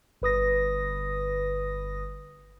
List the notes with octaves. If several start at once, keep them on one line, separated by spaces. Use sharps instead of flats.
G1 B4 D#6 A#6